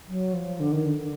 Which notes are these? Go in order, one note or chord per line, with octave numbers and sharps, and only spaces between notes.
F#3
F3
D3
D#3
D3